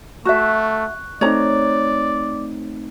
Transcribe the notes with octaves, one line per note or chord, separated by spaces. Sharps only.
A3 F#4 E5 C#6 F#6
A3 C4 D#4 C#5 D5 A#5